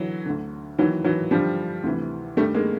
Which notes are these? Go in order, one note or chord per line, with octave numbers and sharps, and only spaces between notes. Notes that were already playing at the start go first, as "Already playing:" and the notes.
Already playing: D3 E3 F#3
D2 D3
D#2 D#3 E3 F#3
E3 F#3
G2 D3 F3 G3
D2 C3 E3
G2 D#3 G3 A3
G#3 A#3